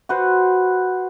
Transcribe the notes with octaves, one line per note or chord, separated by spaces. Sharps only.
F#4 B4 C5